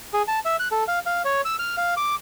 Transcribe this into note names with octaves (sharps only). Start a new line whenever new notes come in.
G#4
A5
E5
F#6
A4
F5
F5
C#5
E6
F6
F5
D6